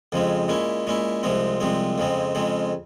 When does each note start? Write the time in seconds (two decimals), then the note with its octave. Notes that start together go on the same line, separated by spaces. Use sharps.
0.12 F2 C#3 F3 G#3 C4
0.48 A#2 G#3 C#4 E4
0.87 A#2 G#3 C#4 E4
1.23 C2 C3 F3 G#3 C4
1.60 C2 C3 F3 G#3 C4
1.98 F2 C#3 F3 G#3 C4
2.35 F2 C#3 F3 G#3 C4